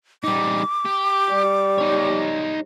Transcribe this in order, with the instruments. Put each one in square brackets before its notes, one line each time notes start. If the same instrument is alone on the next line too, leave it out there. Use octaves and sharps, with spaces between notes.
[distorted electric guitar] G3 D#4 [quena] D6
[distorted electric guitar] G4
[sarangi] G3
[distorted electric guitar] D#4 C#5